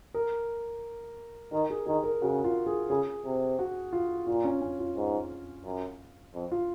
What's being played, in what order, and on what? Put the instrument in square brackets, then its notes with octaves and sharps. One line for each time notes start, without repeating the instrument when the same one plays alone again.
[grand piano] A#4
[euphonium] D#3 [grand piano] A#4
[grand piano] G#4
[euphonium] D#3 [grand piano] G#4
[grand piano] A#4
[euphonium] C#3 [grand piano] F#4
[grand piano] F4
G#4
[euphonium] C#3 [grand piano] G#4
[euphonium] C3
[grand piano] F#4
F4
[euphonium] A#2 [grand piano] F4
[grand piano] C#4
C#4
F4
[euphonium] G#2
F#2
F2
[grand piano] F4